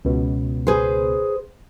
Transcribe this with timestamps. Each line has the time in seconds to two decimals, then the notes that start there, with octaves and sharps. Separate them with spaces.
0.05 C#2 B2
0.67 G#4 B4 C5